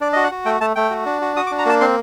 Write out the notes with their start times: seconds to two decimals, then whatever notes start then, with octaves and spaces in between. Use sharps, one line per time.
0.01 D4 D5
0.13 F#4 D#5
0.24 F#5
0.31 F#4
0.45 A3 G5
0.61 A3 A5
0.76 A3 G5
0.91 F#4
1.06 D4
1.21 F#4
1.36 F#4 D#6
1.47 D6
1.51 D4
1.58 A#5
1.66 A#3 A5
1.81 C4 C6